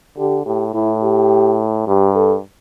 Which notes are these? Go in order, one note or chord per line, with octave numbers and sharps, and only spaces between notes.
D3 G4
A2 G4
A2 E4
G4
G2 G4
A4